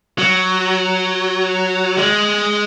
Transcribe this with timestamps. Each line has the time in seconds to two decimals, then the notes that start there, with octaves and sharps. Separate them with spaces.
0.19 F#3
1.97 G#3